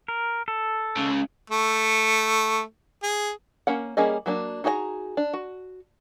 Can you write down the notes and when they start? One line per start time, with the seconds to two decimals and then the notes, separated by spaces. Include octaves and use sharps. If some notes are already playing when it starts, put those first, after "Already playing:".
0.08 A#4
0.48 A4
0.96 C#2 C#3
1.50 A3
3.03 G#4
3.67 A#3 C#4 F#5
3.97 G3 A#3 C#4 G#4 D#5
4.26 F#3 A#3 D4
4.64 D#4 F#4 G#4 D#5 A#5
5.17 D4
5.33 F#4